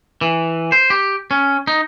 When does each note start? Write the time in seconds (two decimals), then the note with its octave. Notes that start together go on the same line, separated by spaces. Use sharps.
0.21 E3
0.72 C5
0.90 G4
1.31 C#4
1.67 D#4